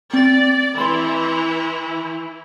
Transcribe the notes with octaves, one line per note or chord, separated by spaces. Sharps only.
C4 D5 A6
E3 E4 B5 C6